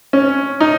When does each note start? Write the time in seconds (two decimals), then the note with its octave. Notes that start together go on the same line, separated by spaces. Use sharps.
0.13 C#4
0.60 D#4